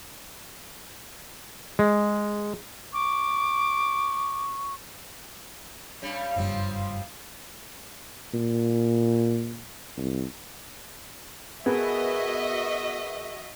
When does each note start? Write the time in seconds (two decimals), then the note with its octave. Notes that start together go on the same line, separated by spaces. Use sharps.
1.79 G#3
2.93 C#6 D6
6.02 G2 G3 C#4
6.36 F#1 G2 F3 G3 C4
8.34 A#2
9.98 C2
11.66 B3 F#4 G#4 A#4 D#5 E5